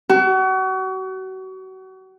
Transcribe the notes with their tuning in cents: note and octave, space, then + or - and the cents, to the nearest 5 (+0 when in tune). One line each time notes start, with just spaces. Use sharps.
F#4 +35